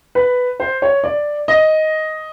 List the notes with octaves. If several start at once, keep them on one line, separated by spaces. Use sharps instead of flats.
B4
C5
C#5
D5
D#5